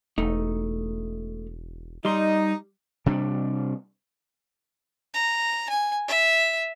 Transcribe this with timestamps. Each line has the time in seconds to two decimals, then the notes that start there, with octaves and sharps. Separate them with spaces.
0.18 E1 A3 D#4
2.05 G3 D#4 C6
3.06 C3 G3 D4
5.14 A#5
5.69 G#5
6.08 E5